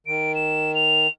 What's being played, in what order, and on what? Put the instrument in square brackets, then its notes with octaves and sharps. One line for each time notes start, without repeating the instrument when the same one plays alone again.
[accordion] D#3 [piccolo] D7
[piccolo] E7
F7